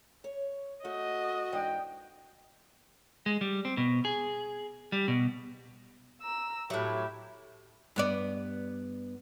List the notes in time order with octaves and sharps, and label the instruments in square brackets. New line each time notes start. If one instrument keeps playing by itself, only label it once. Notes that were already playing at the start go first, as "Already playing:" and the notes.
[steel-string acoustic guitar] C#5
[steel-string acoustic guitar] A3 [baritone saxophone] F#4 [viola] D#5
[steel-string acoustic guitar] G#2 E3 D4 [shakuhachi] G5
[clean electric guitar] G#3
G3
C4
B2
G#4
G3
B2
[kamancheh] A#5 E6
[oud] A2 F#3 [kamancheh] G4 E5
[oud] G2 B3 D5